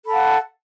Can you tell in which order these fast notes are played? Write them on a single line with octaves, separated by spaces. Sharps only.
A4 B5 F5 F#5